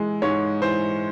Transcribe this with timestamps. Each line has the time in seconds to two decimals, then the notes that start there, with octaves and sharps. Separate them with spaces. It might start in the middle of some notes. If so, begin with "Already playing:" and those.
Already playing: E3 G#3
0.22 G#2 C#5
0.62 E3 C5